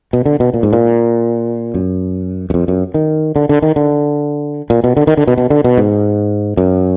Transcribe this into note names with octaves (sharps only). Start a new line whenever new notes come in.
B2
D3
B2
A#2
G#2
A#2
F#2
F#2
F2
F#2
D#3
D3
D3
D#3
D3
A#2
B2
D3
D#3
D3
B2
B2
D3
B2
G#2
F#2